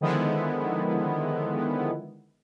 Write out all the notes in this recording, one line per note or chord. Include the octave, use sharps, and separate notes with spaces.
D3 D#3 F3 G#3 B3 E4